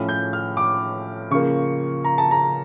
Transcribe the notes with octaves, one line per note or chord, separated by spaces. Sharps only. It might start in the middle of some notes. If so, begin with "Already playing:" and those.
Already playing: A2 F3 C#4
G6
F6
D6
C#3 F3 A#3 C#6
A#5
A5
A#5